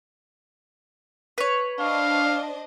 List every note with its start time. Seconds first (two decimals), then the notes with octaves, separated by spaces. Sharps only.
1.38 B4 C#5
1.79 D4 C5 D#5 F5